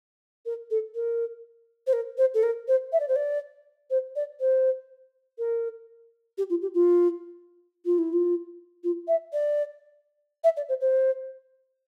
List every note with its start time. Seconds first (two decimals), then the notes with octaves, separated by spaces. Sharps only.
0.45 A#4
0.71 A4
0.95 A#4
1.87 C5
1.93 A#4
2.18 C5
2.34 A4
2.43 A#4
2.68 C5
2.92 E5
3.00 D5
3.08 C5
3.16 D5
3.90 C5
4.16 D5
4.40 C5
5.38 A#4
6.38 G4
6.50 F4
6.62 G4
6.74 F4
7.85 F4
7.98 E4
8.13 F4
8.84 F4
9.08 E5
9.33 D5
10.44 E5
10.57 D5
10.69 C5
10.81 C5